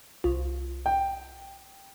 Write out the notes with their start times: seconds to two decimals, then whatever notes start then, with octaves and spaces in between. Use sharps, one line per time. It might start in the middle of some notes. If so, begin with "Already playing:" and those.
0.24 C2 F4
0.86 G5